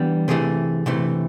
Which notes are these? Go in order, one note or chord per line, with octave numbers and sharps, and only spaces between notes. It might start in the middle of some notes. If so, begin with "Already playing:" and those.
Already playing: E3 G3 B3 D4
C3 E3 G#3 A3 G#4
C3 E3 A3